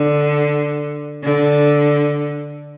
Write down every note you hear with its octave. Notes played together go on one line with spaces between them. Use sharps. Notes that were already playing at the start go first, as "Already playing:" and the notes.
Already playing: D3
D3